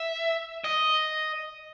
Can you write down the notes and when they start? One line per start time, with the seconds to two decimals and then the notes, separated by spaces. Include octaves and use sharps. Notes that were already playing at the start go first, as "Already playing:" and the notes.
Already playing: E5
0.64 D#5